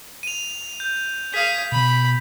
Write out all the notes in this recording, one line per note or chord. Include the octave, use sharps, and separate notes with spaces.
D#7 F7
G6
G#4 F5 B6
B2 B5